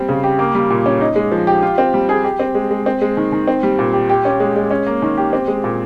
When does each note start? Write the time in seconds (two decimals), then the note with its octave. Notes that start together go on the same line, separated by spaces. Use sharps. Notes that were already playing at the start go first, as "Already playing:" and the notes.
Already playing: G3 C4
0.09 C#3
0.24 G4
0.39 A#3
0.55 G3
0.70 A#2
0.86 C#4
1.01 D#4
1.16 G#3
1.32 F3
1.47 G4
1.62 F4
1.78 C4
1.94 G3
2.09 G#4
2.24 G4
2.40 C4
2.55 G#3
2.71 G#3
2.86 C4
3.01 G#3
3.17 D#3
3.32 D#3
3.47 C4
3.63 G3
3.79 A#2
3.93 G4
4.09 G4
4.25 C#4
4.40 G#3
4.56 G#3
4.71 C#4
4.87 A#3
5.02 D#3
5.17 G4
5.33 C4
5.48 G#3
5.64 A#2